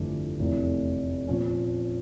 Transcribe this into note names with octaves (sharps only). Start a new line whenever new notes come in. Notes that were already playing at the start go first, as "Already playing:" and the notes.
Already playing: G1 F2 E3 A3 D4
F1 E2 E3 A3
A#2 F3 C#4